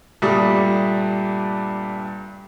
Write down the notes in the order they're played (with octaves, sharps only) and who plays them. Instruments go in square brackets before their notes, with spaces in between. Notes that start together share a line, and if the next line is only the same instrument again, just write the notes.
[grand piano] G2 A#2 G3 A3 D#6